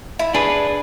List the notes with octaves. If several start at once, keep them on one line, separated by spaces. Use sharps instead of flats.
E4
D4 G#4 B4